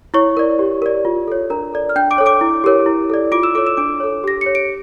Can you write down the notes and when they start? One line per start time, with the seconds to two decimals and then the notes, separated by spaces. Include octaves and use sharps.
0.14 E4 C#5 C#6
0.37 A#4 D5
0.59 G4
0.82 A#4 D5
1.05 F4
1.28 A4 C#5
1.50 D4 A#4 A#5
1.74 A4 D5
1.89 F6
1.96 D4 G5 G6
2.11 D6 D7
2.18 A4 C#5
2.26 D6 D7
2.41 E4
2.64 G4 A#4 C#5
2.86 E4
3.10 A4 D5
3.32 F4 D6 D7
3.43 E6 E7
3.55 A4 C#5 D6 D7
3.66 E6 E7
3.77 D4 D6 D7
4.00 A4 C#5
4.24 G4 A#6
4.41 C#5 C#7
4.55 D7